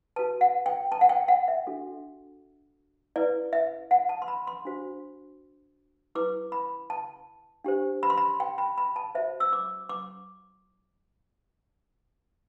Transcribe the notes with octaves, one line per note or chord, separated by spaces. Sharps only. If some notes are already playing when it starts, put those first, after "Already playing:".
F#4 B4 A5
F#5
G5
A5
F#5
G5
F#5
E5
D4 F#4 A4
E4 B4 D5
E5
F#5
A5
C6
B5
C6
D4 F#4 C5
E4 B4 D6
B5
A5
D4 G4 C5
B5
C6
B5
G5
B5
B5
A5
F#4 C5 E5
E6
D6
D6